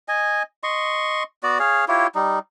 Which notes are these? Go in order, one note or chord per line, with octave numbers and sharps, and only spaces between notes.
D#5 G#5
D#5 C6 C#6
B3 F#4 D5
G#4 C#5 F5
E4 F4 G4 C#5
G3 D#4